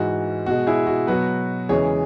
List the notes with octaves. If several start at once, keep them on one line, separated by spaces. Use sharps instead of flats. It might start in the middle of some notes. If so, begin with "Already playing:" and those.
Already playing: G#2 E3 G#3 F#4
B2 G#3 F#4
E4 G#4
F#4
B2 F#3 F#4 B4
E2 C#3 E3 G#3 G#4 C#5